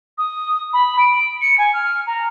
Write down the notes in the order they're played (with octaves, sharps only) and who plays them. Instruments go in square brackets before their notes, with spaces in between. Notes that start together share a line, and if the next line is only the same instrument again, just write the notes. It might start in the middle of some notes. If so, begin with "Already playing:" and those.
[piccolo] D#6
B5
D7
C#7
G#5
F6
A#5